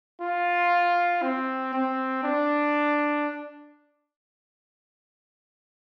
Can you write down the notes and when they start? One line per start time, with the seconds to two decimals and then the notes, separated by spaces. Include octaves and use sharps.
0.21 F4
1.23 C4
1.73 C4
2.24 D4